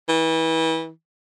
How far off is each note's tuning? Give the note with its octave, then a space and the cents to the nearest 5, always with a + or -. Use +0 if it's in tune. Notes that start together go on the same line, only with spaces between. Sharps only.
E3 -30